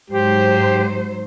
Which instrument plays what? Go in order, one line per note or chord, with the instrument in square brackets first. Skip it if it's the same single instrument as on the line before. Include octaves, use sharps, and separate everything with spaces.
[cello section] G#2 F#3 C5 [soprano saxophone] G4